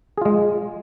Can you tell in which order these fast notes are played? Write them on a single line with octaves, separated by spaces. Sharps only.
G#4 F4 G#3